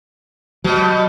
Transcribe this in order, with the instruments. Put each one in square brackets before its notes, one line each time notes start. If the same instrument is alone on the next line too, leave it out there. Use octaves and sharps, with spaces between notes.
[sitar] B2 G3 [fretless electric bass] F#3